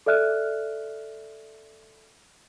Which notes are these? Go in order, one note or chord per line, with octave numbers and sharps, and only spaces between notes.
A4 D5 E5 F6 F#6